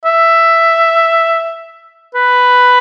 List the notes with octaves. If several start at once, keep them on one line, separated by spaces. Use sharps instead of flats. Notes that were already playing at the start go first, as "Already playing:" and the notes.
E5
B4